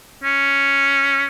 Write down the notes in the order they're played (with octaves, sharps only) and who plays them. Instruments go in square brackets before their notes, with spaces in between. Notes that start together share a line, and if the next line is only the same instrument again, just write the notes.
[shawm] C#4